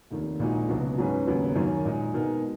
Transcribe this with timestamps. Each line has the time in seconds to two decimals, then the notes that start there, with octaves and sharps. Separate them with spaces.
0.10 F1 D#2 D#3
0.39 A#1 A#2 G#3 D#4 F#4
0.69 C#2 B2 F#3
0.98 G#2 F#3 C#4 G#4 B4
1.27 F1 D#2 C#3 F#3 B3
1.56 F#2 D#3 A#3 C#4
1.85 A#2 G#3 D#4
2.14 B2 G#3 D#4 A#4